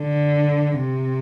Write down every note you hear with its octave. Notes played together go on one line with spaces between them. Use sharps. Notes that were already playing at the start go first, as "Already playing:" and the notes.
Already playing: D3
C3